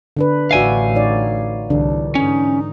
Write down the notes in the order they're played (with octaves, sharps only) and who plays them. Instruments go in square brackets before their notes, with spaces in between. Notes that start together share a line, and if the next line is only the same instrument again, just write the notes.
[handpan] D3 D4 B4
[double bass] A1 [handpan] F#4 D5 E5 [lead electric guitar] F5 G#5
[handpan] D#4 C#5 D5
[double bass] C2 [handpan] D3 E3 D4
[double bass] G#2 D#4 [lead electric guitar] C#4